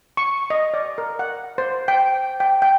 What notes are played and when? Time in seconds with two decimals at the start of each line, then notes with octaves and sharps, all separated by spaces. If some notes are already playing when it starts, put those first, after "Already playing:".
0.17 C#6
0.50 D#5
0.74 D5
0.98 A#4
1.19 F#5
1.58 C5
1.88 G5
2.40 G5
2.62 G5